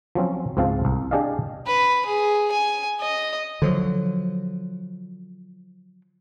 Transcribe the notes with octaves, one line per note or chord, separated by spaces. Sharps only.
F3 F#3 C4 C#4
C#2 G#2 C4 F4 F5 A5
C2
D4 G4 G#4 D5 D#5 F5
B4
G#4
G#5
D#5
D3 F3 F#3